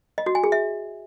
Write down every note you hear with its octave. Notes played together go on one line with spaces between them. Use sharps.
D#5
F#4
G#5
G#4
E5